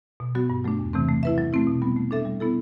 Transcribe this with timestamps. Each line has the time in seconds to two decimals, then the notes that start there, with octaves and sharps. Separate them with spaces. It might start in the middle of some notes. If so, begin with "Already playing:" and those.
0.20 B2
0.35 F#3 B3 F#4
0.50 G2
0.64 F#3 A3 D4
0.79 E2
0.93 C3 E3 A3 C4
1.09 A3
1.23 E4 B4 E5
1.38 F#3
1.53 A3 C4 E4
1.67 B2
1.82 G3 B3
1.97 A3
2.11 D4 A4 E5
2.25 G3
2.40 B3 E4 A4